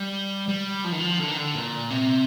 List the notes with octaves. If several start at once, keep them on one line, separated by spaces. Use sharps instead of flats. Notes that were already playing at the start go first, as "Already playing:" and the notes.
Already playing: G3
G3
F3
D#3
F3
D3
D#3
D3
A#2
C3